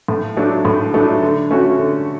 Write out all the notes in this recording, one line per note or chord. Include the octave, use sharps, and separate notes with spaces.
A2
F#3 A3 D4
A2
F#3 A3 D4
D3
A3 C#4 F#4
D3